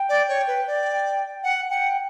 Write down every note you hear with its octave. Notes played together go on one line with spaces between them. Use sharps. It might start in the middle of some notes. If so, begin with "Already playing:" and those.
Already playing: G5
D5
C#5
B4
D5
F#5
F#5 G5